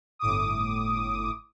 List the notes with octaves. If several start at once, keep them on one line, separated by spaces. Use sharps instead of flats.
G1 A2 D6 D#6